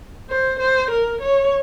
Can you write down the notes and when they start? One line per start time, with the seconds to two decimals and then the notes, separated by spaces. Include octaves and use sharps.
0.30 C5
0.60 C5
0.91 A#4
1.21 C#5